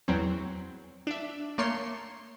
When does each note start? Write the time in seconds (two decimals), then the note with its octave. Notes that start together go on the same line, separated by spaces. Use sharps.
0.08 E2 F#3 C4
1.07 D4 E5
1.58 A3 A#3 C#5 C6 C7